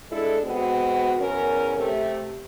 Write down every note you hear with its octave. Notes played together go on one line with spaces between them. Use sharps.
G#3 D4 E4 A4
G#3 B3 C4 F#4
E2 C#4 A#4
C3 A3 G4